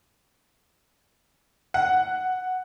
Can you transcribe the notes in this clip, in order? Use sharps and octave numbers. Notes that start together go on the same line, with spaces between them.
F#5